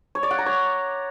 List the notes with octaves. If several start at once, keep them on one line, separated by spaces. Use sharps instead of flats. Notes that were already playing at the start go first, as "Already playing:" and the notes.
C#5
D5
F#5
A#5
C#5